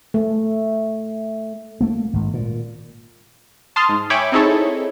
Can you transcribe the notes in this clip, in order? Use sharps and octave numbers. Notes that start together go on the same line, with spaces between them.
A3
A3 A#3
G#1
A#2
A5 C6 D#6 F6
G#2
C#5 E5 G5 G#5 B5 D6
C4 D#4 E4 G#4 A4 C#5